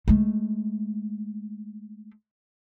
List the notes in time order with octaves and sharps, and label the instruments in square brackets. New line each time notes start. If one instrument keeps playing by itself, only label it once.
[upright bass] G#3 A3